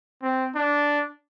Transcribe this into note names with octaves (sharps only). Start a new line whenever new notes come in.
C4
D4